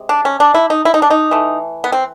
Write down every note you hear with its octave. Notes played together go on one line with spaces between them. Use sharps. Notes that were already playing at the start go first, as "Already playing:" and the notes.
Already playing: C3 G#3
D4
C#4
D4
E4
D#4
E4
D#4
D4
D#4
E3 A3
B3
C4